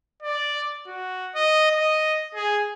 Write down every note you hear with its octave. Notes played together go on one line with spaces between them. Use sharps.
D5
F#4
D#5
D#5
G#4